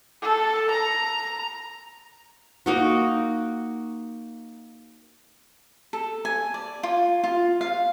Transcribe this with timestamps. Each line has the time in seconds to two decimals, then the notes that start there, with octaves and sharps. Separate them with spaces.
0.22 A4
0.70 A#5
2.66 A#3 D#4 F#4
5.93 A4
6.25 G#5
6.54 D5
6.83 F4
7.24 F4
7.61 F5